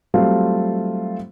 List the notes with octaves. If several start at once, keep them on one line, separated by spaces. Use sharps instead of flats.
F#3 G3 A3 C4 F4